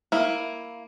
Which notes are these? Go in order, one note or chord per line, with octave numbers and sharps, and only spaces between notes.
A#3 E4